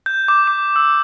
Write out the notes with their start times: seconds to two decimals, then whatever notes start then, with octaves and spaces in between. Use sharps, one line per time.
0.06 G6
0.28 D6
0.47 D6
0.76 E6